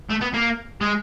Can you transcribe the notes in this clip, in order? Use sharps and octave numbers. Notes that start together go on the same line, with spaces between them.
A3
B3
A#3
G#3